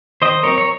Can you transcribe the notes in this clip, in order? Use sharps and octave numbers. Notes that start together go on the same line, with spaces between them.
D#3 C5 D#5
F#3 C4 A#4 C#5
C#5